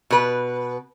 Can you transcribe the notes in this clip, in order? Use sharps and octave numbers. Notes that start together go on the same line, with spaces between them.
B2 B4